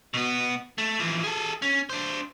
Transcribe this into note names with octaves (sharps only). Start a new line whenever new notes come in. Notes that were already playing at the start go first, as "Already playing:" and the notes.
B2 B3
A3
E3 F3
G#4 A4
C#4
D4 C5